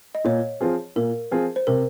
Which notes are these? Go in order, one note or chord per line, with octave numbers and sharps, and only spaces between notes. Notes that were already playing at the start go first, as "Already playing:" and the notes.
D#5
A#2 C#5
F3 C4 F4 G#4
A#2 A#4
F3 C4 F4 G#4
C5
C3 A#4